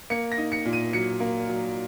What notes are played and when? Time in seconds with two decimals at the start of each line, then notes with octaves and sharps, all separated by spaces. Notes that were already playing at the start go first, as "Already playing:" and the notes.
0.10 A#3 C#7
0.32 A#6
0.38 D#4
0.52 C#7
0.65 A#2
0.73 D#7
0.93 F#3 C#7
1.20 A#3
1.49 F#3